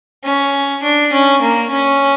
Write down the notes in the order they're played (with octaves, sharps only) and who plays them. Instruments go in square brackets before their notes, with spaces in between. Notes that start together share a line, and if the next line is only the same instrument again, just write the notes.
[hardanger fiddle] C#4
D4
C#4
A#3
C#4